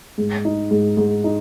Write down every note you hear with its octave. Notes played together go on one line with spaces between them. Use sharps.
G#2
D#4
G#2
G#2
D#4